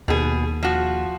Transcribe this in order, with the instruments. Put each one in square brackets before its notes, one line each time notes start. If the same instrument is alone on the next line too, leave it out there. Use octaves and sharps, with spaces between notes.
[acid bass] D#2 [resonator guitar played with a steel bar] B2 G#4
[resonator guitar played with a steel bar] F3 F#4